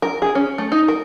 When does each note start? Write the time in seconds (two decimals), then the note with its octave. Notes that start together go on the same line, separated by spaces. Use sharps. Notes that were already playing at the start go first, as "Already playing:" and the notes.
0.02 A#4
0.22 G#4
0.35 C#4
0.58 A3
0.72 D#4
0.88 A#4